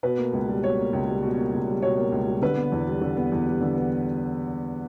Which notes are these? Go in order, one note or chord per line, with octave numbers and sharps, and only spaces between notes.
B2 B4
A#3
C#2
G3
B2 C#5
A#3
C#2
G3
B2
A#3
C#2
G3
B2 C#5
A#3
C#2
G3
D3 B4
B3
E2
G3
D3
B3
E2
G3
D3
B3